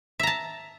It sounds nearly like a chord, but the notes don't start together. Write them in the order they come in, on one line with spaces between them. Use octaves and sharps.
E5 A#5 A5